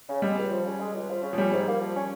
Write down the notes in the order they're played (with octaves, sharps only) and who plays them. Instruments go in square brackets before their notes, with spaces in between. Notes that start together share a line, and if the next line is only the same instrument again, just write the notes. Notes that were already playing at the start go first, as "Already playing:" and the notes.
[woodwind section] C#3
[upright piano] G3 [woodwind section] G#3
[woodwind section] C#2
F3
C#3
G#3
C#2
F3
C#3
[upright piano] F3
[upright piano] G3 [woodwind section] C#4
[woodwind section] G#2
A#3
F3
C#4